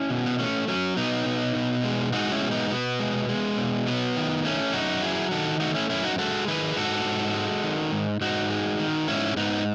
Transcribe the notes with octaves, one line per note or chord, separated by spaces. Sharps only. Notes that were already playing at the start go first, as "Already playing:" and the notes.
Already playing: C#4 E4
B2
B3
A3 C#4
F#3 C#4
B2 B3 D#4
B2
B2
G#3
G#3 D#4 F#4
C#4 E4
B2
B3 D#4
B2 B3
G#3
G#3
B2
F#3 B3
D#3
A3 C#4
F#2 D#4 F#4
F#3 E4 G#4
D#3 F#4 A4
A3 D#4 F#4
C#4 E4
F#2 C#4 E4
D#4 F#4
G#3 F#4 A4
D#3 G#4 B4
G#2 F#4 A4
G#2
G#3
D#3
G#2
G#2 D#4 F#4
G#3
D#3
G#2 C#4 E4
G#2 B3 D#4